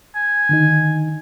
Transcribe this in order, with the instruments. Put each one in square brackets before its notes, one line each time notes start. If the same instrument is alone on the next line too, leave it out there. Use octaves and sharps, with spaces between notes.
[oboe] G#5
[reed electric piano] D3 D#3 D#4